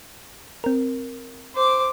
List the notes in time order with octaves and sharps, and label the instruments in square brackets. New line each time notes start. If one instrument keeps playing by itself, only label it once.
[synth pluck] C4 A#4
[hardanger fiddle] C5 D6